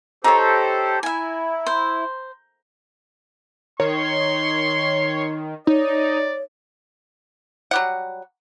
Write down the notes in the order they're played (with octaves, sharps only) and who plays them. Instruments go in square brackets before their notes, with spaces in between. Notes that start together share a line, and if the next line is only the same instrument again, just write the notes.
[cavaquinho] D#4 C#5 [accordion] G4 A4 C5 [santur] A#5
[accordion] E4 [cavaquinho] E5 G#5
[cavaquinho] C5
[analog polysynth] D#3 [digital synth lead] C#5 [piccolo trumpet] C6
[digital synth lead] D#4 [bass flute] C#5 [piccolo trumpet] D5
[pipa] F#3 G3 F#5